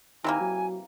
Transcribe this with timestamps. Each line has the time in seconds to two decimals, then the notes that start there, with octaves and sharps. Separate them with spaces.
0.24 C3 D#3 E3 A#3 G#5
0.40 F#3